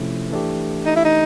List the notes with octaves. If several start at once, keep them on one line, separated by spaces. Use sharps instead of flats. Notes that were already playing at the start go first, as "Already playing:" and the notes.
Already playing: C3 F3 A3 C#4 E4
E3 A3 D4 G4
D#4
E4
D#4